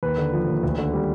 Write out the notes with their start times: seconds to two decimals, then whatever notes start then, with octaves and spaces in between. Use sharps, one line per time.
0.03 D#2 B4
0.18 D3
0.33 F3
0.48 D#2
0.63 D2
0.78 D3
0.93 G3